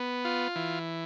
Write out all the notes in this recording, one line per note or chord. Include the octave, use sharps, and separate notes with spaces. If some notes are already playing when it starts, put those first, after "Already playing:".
Already playing: B3
F4
E3